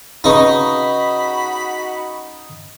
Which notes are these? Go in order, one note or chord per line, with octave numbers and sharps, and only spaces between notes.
C#3 D#4 F#4 B4 B5 C#6